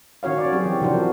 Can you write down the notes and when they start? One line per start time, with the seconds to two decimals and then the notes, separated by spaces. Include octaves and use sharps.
0.23 D#3 C#4 F#4 C#5 F5
0.38 D5
0.53 F#3 C4 G4 G#4
0.66 E3
0.81 C3 F3 D4 F#4 C5
0.94 A#4